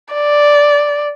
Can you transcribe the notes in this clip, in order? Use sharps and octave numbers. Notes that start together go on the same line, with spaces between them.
D5